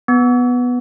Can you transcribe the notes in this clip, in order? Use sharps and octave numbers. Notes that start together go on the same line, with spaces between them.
B3